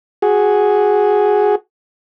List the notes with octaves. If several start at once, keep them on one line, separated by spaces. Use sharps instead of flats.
F#4 G#4